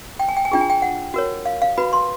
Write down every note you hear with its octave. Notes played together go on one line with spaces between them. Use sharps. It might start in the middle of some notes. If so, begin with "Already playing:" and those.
G5
G#5
G5
G#5
D4 F4 G#4 G5
G#5
G5
F#5
F#4 A#4 C#5
F5
F5
F#4 B4 B5
C6